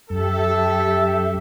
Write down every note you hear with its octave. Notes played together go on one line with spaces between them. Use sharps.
F#2 G4 A4 E5